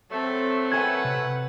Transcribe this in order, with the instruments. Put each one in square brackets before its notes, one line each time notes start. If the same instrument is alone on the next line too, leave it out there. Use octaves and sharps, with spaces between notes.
[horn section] F#3 A3 [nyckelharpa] C4 A4
[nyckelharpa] B4 F#5 [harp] G#5 G#6
[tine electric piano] C3